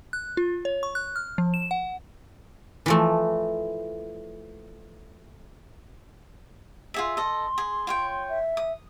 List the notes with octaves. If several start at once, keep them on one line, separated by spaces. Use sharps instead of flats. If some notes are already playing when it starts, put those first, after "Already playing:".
F#6
F4
C#5
C#6
F#6
F6
F3
E7
F#5
E3 F3 A3
F4 G#4 E5
A4 D#5 C6
G#4
F4 C#5 G5
E5
D#6